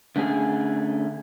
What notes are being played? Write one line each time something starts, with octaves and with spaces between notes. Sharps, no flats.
D3 A3 C#4 G#4